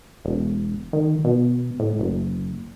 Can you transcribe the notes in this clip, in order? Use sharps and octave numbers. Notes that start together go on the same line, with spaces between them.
E1
D#3
B2
A2
F#1